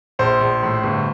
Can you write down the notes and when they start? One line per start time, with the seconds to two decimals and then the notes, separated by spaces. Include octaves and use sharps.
0.19 A#1 C5
0.41 A#1
0.63 A2
0.83 G1